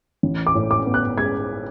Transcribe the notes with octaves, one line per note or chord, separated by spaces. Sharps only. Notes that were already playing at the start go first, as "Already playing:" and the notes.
A1
D6
A2
D6
B3
F#6
G#3 G#6